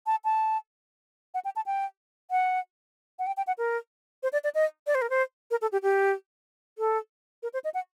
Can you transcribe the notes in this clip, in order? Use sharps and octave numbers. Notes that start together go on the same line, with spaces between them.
A5
A5
F#5
G5
A5
G5
F#5
F#5
G5
G5
F#5
A#4
C5
D5
D5
D#5
D5
C5
A#4
C5
A#4
A4
G4
G4
A4
A#4
C5
D#5
F#5